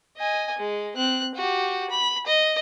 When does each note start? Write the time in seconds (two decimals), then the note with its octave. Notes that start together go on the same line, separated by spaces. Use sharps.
0.18 D#5 G#5
0.58 G#3
0.96 C4 F#6
1.34 F#4 G4
1.90 B5
2.26 D#5